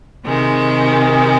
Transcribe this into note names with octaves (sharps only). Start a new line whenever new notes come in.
C3 D#3 G#3